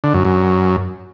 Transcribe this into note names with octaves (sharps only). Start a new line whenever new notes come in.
D3
F#2
F#2